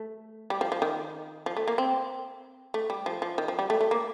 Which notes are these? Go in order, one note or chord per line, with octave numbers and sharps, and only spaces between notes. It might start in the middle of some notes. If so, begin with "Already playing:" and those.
Already playing: A3
G3
F3
F3
D#3
F3
A3
A#3
C4
A3
G3
F3
F3
D#3
F3
G3
A3
A3
A#3